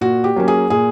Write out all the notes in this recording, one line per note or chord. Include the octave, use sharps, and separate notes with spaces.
A#2 F#4
G4
F#3 A#3 C#4
G#4
A#2 G#4